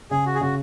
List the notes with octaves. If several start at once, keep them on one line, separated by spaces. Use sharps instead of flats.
C#3 G#4
F#4
G#4
C#3 F#4